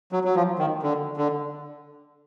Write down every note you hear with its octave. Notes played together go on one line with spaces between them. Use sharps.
F#3
F#3
F3
D#3
D3
D3